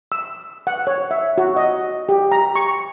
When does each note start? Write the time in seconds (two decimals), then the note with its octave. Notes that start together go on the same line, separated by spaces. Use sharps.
0.12 E6
0.67 F#5
0.87 C#5
1.11 E5
1.38 F#4
1.56 D#5
2.09 G4
2.32 A#5
2.56 C#6